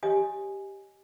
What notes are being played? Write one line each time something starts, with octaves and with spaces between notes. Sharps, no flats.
G4 C#5 D#5 G#5 D#6